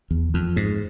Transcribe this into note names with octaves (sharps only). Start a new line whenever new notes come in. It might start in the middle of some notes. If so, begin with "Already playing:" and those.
E2
F2
G#2